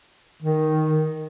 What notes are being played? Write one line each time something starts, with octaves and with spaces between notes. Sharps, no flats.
D#3